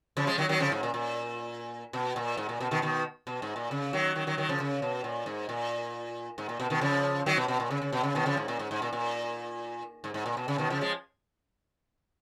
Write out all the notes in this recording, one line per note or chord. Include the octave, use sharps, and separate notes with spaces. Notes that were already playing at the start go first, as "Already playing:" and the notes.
C#3 F3
F3 G#3
D#3 F#3
D#3 F#3
C#3 F3
G#2
A#2
A#2
B2
A#2
G#2
A#2
B2
B2 D#3
B2 D#3
B2
G#2
A#2
C#3
D#3 F#3
D#3 F#3
D#3 F#3
D#3 F#3
C#3 F3
C#3
B2
A#2
G#2
A#2
G#2
A#2
B2
B2 D#3
C#3 F3
D#3 F#3
B2
B2
A#2
C#3
C#3
B2
C#3
B2 D#3
C#3 F3
G#2
A#2
G#2
G#2
A#2
A#2
G#2
G#2
A#2
B2
C#3
B2 D#3
C#3 F3
F3 G#3